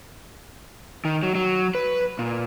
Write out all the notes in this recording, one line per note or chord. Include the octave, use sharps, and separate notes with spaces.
D#3
F#3
F#3
B4
A#2